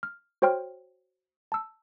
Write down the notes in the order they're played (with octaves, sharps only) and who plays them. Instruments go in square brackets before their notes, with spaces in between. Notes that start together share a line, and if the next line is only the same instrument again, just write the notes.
[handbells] F6
F#4 C5 C#5 G5 C6 F6
A5 E6